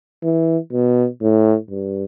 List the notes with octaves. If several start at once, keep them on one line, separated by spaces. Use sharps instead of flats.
E3
B2
A2
G2